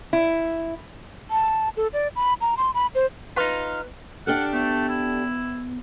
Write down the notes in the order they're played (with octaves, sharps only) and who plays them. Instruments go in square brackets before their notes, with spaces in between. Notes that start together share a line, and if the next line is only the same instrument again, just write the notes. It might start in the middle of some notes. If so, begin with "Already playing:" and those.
[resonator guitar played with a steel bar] E4
[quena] A5
A4
D5
B5
A#5
C6
B5
C5
[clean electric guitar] D#4 F4 [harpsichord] B4
[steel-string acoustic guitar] D4 G4 A4 [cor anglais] F#5 [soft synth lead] F6
[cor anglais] A3 [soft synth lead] B3
[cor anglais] E4